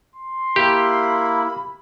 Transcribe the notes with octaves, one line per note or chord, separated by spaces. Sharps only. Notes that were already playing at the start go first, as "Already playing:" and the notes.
C6
A#3 E4 G4 B5